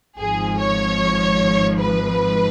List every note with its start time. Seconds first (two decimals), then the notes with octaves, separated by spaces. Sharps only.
0.18 G#1 G#2 F3 G#4
0.58 C#5
1.78 B4